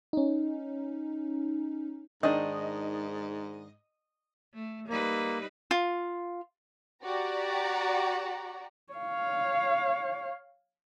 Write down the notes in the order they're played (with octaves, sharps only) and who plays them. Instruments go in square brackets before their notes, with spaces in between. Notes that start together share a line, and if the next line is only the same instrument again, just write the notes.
[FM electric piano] C#4 D#4
[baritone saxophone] G#2 [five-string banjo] D#3 D4 [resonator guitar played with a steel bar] D#5
[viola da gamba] A3
[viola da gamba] G3 D#4 B4 [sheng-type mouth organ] A#3
[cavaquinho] F4
[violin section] F#4 G4 D5 A#5
[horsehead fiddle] C#5 F5